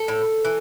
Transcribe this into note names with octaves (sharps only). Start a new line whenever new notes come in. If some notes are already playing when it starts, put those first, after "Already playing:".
Already playing: A4
A2
E3